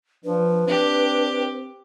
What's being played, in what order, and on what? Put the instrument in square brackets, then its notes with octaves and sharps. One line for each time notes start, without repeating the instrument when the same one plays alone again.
[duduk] F3 [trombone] D4 [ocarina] B4
[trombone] C4 [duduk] D4 [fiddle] G4